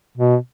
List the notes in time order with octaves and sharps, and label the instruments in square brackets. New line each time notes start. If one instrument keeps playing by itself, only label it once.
[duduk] B2